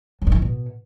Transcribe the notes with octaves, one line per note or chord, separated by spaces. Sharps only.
F#3
G2
D#3
F3
B2